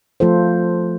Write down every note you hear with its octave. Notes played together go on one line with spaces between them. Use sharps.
F3 A3 F4 A4 C5